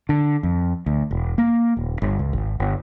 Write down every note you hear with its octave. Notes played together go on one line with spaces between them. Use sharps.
D3
F2
D2
E1
A#3
D#1
G1
C#2
G#1
G1